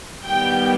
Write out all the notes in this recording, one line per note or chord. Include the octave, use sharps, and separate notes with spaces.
D#3 G3 B3 G5